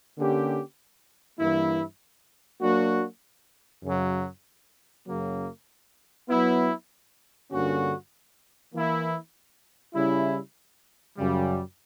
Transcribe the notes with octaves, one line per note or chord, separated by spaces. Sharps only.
D3 A#3 C#4 G4
G2 E3 A#3 E4
F#3 A#3 D4 F#4
F#2 C#3 F#3
F#2 C#3 F#3 A#3
F#3 B3 E4
G2 D3 A#3 C#4 F#4
E3 A#3 E4
C#3 G3 C#4 E4
F#2 C#3 G3